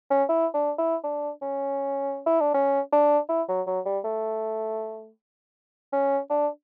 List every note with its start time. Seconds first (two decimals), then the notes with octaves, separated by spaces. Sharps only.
0.10 C#4
0.29 E4
0.54 D4
0.78 E4
1.04 D4
1.42 C#4
2.26 E4
2.41 D4
2.54 C#4
2.93 D4
3.29 E4
3.49 F#3
3.67 F#3
3.86 G3
4.05 A3
5.93 C#4
6.30 D4